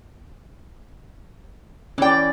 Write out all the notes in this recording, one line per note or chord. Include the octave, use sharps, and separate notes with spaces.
E3 C#4 D5 G5